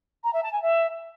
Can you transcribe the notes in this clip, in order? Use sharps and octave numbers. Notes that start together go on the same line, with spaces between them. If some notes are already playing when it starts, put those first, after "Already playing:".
A#5
E5
A5
G#5
E5